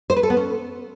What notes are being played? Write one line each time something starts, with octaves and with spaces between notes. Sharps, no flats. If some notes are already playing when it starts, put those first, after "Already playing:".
C5
B4
A4
B3
C#4